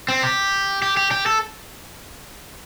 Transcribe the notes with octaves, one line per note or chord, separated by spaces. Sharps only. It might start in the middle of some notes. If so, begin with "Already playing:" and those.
C4
G4
G4
G4
G4
A4